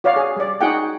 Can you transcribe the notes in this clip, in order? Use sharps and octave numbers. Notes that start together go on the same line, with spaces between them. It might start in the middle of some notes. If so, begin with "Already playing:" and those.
F#4 C#5 D5 F5
G#4
G3 D5
D#4 F#4 G#4 F#5 G5